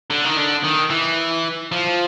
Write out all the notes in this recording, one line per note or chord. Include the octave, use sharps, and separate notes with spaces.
D3
D#3
D3
D#3
E3
F3